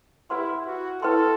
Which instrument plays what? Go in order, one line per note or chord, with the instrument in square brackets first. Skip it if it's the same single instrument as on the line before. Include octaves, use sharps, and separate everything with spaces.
[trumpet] E4 [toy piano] G4 B4 F#5 C6
[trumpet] F#4
[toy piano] E4 B4 E5 G5 C6 [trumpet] A4